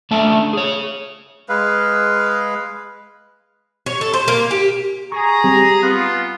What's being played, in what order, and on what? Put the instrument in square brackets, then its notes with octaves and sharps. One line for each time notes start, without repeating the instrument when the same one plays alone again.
[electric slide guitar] A3 C#4 D4 E5 A5
G#4 C#5
[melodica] G#3 B4 F5
[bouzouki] C#5
A4
C5
A#3
G4
[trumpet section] G#4 A#5 [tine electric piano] C#6
[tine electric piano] G3 C4 G4
[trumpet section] B3 F4 [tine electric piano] F#6